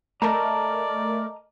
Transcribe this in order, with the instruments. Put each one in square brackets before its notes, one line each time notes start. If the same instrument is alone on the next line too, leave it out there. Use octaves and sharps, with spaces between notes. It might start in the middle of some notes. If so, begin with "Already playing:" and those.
[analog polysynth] A3 A#4 [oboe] D5 [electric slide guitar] D#5 A5 A#5